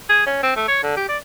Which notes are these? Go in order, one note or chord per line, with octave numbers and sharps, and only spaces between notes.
G#4
C#4
C4
A3
C#5
D3
G4
D5